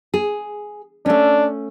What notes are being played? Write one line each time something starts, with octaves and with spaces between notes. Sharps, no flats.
G#4
A3 C#4 D4